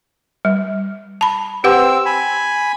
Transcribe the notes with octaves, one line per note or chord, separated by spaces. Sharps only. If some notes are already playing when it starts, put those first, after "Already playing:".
G3
A5 B5
C4 G4 B4 F#5 E6
G#5 B5